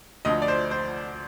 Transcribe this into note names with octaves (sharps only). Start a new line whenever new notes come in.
D2 D3 F3 D#5
D5
C5
C5